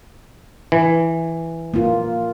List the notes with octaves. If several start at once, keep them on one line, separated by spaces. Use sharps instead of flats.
E3
A#3 F4